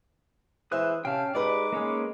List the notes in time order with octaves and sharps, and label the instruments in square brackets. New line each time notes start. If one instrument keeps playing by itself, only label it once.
[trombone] E3 [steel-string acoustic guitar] G#3 C5 E5 [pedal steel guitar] D#6 F#6
[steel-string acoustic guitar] C3 [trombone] C#4 [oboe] F5 [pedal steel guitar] G5 A5
[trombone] G#3 [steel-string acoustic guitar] D#4 B4 D#5 [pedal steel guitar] G4 D5 [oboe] D6
[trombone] G#3 [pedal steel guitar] A#3 C#4 C#5